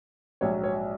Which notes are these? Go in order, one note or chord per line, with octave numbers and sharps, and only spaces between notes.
A#1 G#2 F#3 C#5
C#5